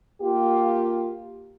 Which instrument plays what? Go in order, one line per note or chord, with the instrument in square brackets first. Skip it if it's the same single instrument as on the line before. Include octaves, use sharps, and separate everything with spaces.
[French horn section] A#3 F4 G4